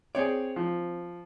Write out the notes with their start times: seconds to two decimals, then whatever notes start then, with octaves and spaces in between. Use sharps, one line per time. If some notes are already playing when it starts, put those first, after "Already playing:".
0.15 C4 G#4 C#5 D5
0.56 F3